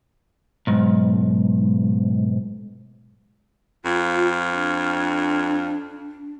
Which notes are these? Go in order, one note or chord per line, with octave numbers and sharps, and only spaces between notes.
B1 G#2
F2 F4
D4